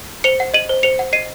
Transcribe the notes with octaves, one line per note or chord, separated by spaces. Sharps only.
C5 C#7 F7
F#5
D#5 D#7 F#7
C5
C5 C#7 F7
F#5
D#5 C7 D#7